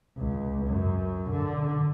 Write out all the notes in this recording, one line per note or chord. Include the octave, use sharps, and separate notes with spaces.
C#2
F#2
D3